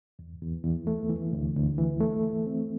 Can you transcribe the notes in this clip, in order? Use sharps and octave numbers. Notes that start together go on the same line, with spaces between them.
E2
E2
E2
A3
E3
D2
D2
E3
A3
A3
C4